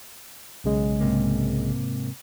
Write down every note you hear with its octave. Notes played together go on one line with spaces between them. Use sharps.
B1 C#3 G#3
G#2 C3 A#3